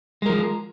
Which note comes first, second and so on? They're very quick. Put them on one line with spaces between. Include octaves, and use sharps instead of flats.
G#3 A#4 F3